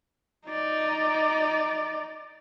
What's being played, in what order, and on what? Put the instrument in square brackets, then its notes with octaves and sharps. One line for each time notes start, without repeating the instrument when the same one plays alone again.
[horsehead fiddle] D#4 D5